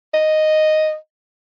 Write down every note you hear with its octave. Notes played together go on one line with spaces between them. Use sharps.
D#5